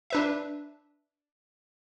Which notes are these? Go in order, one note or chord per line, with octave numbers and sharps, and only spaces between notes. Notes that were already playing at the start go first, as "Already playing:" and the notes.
D4 B4 E5